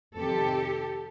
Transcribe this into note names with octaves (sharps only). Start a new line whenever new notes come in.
F2 C3 D#3 G4 A4